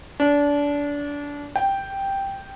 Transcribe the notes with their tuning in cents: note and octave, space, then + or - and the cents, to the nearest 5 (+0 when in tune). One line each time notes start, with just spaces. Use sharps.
D4 -25
G5 +0